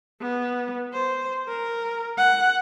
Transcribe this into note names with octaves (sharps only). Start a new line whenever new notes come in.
B3
C5
A#4
F#5